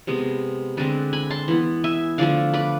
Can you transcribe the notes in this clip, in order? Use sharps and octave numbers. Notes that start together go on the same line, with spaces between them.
C3 G#3 B3
D3 G#3 C4 B4 D5
G#5 B5
A5 C6
E3 B3
E5 G#5
D3 F3 A3 D5 F5
B4 D5